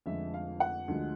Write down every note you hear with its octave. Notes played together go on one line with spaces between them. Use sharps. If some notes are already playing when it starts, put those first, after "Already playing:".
F1 F2 D3 F3 G#3 E5
F5
F#5
D2 D3 F3 G#3